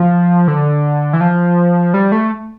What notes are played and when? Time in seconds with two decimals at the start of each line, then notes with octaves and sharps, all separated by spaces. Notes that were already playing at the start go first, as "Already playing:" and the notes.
Already playing: F3
0.48 D3
1.13 E3
1.21 F3
1.94 G3
2.12 A3